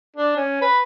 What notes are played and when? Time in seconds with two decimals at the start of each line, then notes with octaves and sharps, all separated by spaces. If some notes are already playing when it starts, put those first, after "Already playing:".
0.16 D4
0.37 C#4
0.61 B4